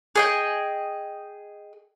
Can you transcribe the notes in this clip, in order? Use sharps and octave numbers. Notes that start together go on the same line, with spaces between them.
G#4 D#5 G5